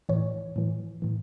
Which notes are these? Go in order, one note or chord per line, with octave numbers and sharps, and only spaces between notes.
A2 E3 C#5
A2 E3
A2 E3